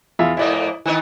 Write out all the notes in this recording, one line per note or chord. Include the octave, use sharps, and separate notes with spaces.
E2 F4 E5
F2 G#2 A#3 E4 D5 D#5
D#3 E3 B3 D#4